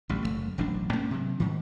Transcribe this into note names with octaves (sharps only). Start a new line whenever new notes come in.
A1 D2 G3
F#1 D#2 A3
E1 A1 F#3 D4
G#2 A#3 C#4
C3 F#3
G#2 D#3